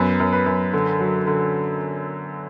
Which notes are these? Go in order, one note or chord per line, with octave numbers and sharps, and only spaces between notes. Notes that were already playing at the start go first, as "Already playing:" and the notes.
Already playing: F#2 B3 B4
F#2
B4
F#2
D3
F#3
D3